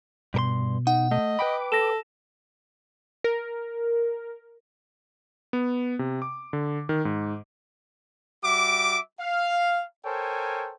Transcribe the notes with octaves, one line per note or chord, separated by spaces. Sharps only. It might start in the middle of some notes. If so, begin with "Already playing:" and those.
G2 B2 A#4 C6
D#4 F#5
A3 D#5
B4 G5 B5 D6
A4 A#6 E7
A#4
B3
C3
D6
D3
D#3
G#2
G3 F#4 E5 D6
F5
A4 A#4 C5 C#5 G5 G#5